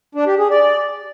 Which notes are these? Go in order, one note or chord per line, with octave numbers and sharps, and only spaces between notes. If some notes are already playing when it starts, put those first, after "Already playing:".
D4
G4
G#4
D5